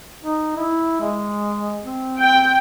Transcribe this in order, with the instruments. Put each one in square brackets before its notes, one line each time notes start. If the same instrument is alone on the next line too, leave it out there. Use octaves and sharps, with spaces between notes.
[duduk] D#4
E4
G#3
C4
[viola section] G5